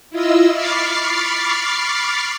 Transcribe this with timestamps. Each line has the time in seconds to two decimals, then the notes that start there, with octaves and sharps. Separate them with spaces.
0.10 E4 F4 D#5 E6
0.52 B5 C#6 D6 F6 A6 C7